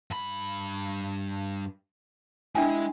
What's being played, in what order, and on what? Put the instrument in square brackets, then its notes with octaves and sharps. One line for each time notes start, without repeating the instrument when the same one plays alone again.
[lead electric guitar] G2 B5
[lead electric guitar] G#3 [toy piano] D4 G5 G#5 [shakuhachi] E4